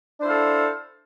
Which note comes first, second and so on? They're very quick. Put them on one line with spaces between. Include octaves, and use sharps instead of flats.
D4 C5 E4 F5 A4